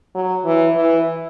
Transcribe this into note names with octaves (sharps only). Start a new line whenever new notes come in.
F#3
E3
E3